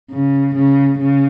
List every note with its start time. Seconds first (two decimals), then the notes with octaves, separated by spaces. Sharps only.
0.11 C#3
0.55 C#3
0.99 C#3